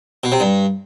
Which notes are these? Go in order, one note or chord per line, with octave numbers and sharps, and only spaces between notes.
B2
C3
G2